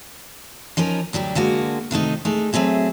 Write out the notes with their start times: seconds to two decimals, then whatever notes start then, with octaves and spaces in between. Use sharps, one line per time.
0.77 F3 C#4 D#4 A#4
1.13 D2 F#3 G3 G4
1.35 D3 G#3 A#3 F#4
1.91 C3 D#3 A3 D#4
2.25 G#3 A3 D#4
2.53 F#3 A3 C4 G#4 E5